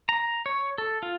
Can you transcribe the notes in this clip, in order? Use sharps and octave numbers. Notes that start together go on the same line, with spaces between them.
A#5
C#5
A4
F4